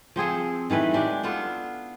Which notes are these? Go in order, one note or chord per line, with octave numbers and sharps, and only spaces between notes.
F3 C4 G#4 A4
D#3 E3 A3 B4
G#3 D4 G4
B3 D4 F4 A4